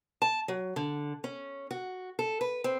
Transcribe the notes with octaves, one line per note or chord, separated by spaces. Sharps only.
A5
F#3
D3
C#4
F#4
A4
B4
C4